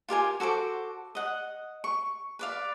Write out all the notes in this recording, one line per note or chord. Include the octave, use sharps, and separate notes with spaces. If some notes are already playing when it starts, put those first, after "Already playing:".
F4 G4 A#4 G#5
F#4 A4 C5 D6
D#5 F#5
C#6
B4 D5 F5